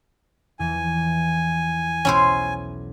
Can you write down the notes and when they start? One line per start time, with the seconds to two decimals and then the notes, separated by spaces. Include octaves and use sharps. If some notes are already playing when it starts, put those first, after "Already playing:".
0.59 E2 E3 F3 G#5
2.05 B1 C#4 E4 C5